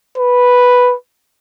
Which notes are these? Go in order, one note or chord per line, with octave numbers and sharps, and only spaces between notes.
B4